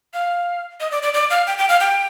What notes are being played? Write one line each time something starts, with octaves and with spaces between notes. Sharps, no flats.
F5
D#5
D5
D5
D5
F5
G5
G5
F5
G5